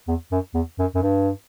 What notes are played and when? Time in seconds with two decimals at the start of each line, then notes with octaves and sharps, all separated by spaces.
0.08 E2
0.32 F#2
0.54 E2
0.79 F#2
0.95 F#2
1.02 G2